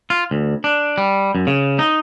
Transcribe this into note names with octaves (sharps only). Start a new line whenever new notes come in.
F4
D2
D4
G3
F#2
C#3
D#4